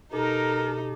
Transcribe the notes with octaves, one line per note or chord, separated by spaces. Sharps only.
B2 D#4 G4 A4 A#4